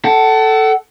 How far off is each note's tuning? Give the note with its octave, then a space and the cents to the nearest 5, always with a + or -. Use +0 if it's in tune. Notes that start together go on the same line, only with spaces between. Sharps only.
A4 +0 F#5 +35